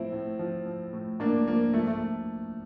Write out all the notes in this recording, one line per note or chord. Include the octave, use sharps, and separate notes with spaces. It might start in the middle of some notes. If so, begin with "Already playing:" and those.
Already playing: A2 F3 C4 E4
A2
F3
F3
A2
A2 A#3 D4
F3 A#3
F3 A3
A3